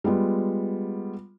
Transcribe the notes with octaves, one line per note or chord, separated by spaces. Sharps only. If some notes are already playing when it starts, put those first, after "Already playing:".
G3 G#3 B3 F4